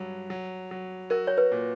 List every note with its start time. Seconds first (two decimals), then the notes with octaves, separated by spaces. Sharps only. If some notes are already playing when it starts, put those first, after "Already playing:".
Already playing: G2 F#3
0.30 F#3
0.71 F#3
1.10 F#4 A#4
1.27 C#5
1.38 B4
1.52 A#2